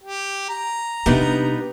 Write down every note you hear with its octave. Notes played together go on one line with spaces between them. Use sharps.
G4
A#5
C3 G3 B3 D4 D#4